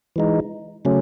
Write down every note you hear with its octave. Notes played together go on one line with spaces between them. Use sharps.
E3 G#3 D#4
C#3 F#3 A3 C#4